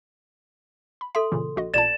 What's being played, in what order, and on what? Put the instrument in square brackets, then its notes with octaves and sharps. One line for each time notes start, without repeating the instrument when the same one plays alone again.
[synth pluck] B5
[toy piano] A4 C6 [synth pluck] E5
[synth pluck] A#2 C#3 E3
A#1 F#4 D#5
[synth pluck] A1 A#2 A5 [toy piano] D5 [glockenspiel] A6 E7